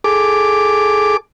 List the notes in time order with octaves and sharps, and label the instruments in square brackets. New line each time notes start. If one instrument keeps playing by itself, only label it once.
[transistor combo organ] G#4 A4 D6